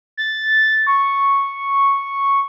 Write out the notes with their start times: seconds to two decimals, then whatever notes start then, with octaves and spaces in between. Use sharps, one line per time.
0.17 A6
0.87 C#6